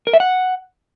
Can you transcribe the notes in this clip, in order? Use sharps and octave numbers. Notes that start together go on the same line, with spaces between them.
A#4
E5
F#5